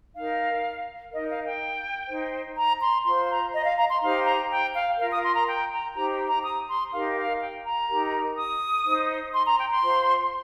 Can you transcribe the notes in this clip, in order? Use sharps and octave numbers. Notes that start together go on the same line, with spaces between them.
D#4 A#4 F5
D#4 A#4 D#5
F5
G5
D#4 C5
A#5
C6
F4 C5 C6
A#5
D#5
F5
A#5
C6
D#4 G4 C5 F5
A#5
G5
F5
F4 A#4 F5
D#6
C6
A#5
G5
A#5
D#4 G4 C5 A#5
A#5
D#6
C6
D#4 G4 A#4 F5
F5
G5
A#5
D#4 G4 A#4
D#6
D#4 C5
C6
A#5
G5
C6
F4 C5